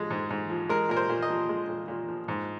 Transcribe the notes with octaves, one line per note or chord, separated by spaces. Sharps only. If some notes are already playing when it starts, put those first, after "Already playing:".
Already playing: G#2 F3 G#3
G#2
G#2
F3
G#3 A#4
A#2 A#4
C5
A#2
D#5
F3
G#3
A#2
A#2
F3
G#2